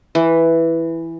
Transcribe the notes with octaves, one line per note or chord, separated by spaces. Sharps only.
E3